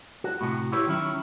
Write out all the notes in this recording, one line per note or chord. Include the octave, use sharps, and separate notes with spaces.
F#4
A2 C3 F#4
E4 G4 B4 C#5
D#3 F#3 C#4 E4